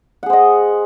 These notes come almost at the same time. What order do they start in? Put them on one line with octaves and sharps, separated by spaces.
F#5 G#4 C5 D#5